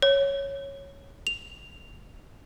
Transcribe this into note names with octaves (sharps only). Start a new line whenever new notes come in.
C#5
F7